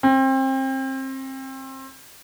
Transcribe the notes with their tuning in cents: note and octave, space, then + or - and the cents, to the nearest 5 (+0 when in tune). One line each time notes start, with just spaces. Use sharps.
C4 +30